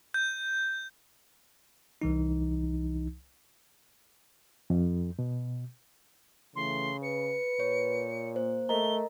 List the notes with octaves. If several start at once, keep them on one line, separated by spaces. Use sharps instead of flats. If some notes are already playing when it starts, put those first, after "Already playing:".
G6
C2 E3 D#4
F2
B2
C#3 E3 A3 C6
B4 C#7
A#2 C#5
A#3 C5
A3 A#4 D#5 A#5 G7